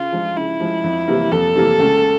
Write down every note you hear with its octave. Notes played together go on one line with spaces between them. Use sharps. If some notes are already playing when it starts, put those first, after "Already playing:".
Already playing: C#3 F4
F3 G#3
C#3 E4
F3 G#3
F2
C3 E3 G3 A#3
F2 A4
C3 E3 G3 A#3
C#2